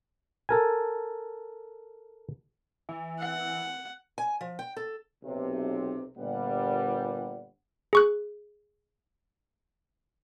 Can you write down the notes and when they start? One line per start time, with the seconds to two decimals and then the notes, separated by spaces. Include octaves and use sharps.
0.49 A4 A#4 G#5
2.89 E3
3.19 F#5
4.18 G#5
4.41 F3
4.59 G5
4.77 A4
5.23 B1 C3
6.17 G1 A#2 G3 F#5
7.93 G#4 C#6 F#6